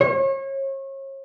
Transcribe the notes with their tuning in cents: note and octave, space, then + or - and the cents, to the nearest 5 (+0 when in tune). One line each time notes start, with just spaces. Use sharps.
C#5 -35